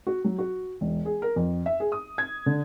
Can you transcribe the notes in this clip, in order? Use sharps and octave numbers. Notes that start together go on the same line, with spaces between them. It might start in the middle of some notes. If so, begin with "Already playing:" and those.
F#4
F#3
F#4
E1
G#4
A#4
F2
E5
G#4
D#6
G#6
D3